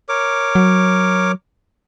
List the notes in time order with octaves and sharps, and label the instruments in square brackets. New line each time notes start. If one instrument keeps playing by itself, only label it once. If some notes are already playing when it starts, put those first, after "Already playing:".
[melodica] A#4 C#5 D6
[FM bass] F#3